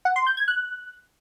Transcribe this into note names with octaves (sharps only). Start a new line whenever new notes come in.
F#5
C6
G6
G#6
F#6